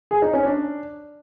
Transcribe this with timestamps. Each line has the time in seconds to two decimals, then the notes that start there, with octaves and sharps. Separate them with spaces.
0.11 G#4
0.22 D#4
0.33 C#4
0.45 D4